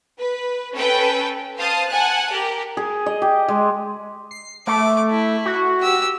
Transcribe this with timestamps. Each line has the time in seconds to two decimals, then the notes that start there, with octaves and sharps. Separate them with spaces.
0.19 B4
0.73 C#4 A4 B4 G5
1.57 C5 F5 A5 D#6
1.89 F#5 G#5 A5 F#6
2.31 G4 A#4
2.77 G#4
3.06 D#5
3.22 G4
3.48 G#3
4.31 C7
4.67 A3 D6
5.11 E4
5.46 F#4
5.81 G4 E6